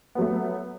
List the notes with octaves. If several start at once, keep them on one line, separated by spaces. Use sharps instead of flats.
F#3 A3 B3